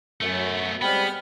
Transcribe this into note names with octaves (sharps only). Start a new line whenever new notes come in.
F#2 A3 B3
G3 G#3 B3 C4 G5 B5 F6